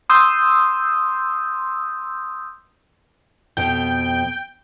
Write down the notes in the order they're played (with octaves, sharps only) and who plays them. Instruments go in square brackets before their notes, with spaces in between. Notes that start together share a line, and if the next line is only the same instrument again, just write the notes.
[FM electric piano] C6 D#6 E6 G6
[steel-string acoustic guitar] F2 B2 [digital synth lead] G5